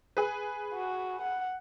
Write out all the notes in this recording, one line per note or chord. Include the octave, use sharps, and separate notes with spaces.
G#4 B4
F#4
F#5